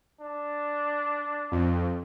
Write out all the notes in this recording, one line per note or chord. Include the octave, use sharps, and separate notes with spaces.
D4
F2